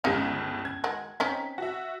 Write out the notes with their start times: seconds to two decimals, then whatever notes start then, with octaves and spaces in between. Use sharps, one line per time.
0.04 G1 C#2 C#3 D#4 F5
0.65 G#6
0.84 D#3 G#3 F#4
1.20 C4 C#4 D#4 B6
1.58 F#4 E5